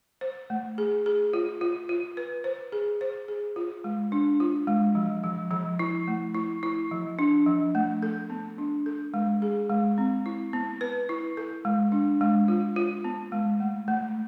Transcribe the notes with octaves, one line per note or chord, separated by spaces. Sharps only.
C5
A3
G#4
G#4
F4
F4
F4
B4
C5
G#4
C5
G#4
F4
G#3
D4
F4
G#3
F3
F3
F3
E4
A3
E4
E4
F3
D4
F3
A3
A4
B3
D4
A4
G#3
G#4
G#3
C4
E4
B3
B4
E4
A4
G#3
D4
G#3
F4
F4
B3
G#3
A3
A3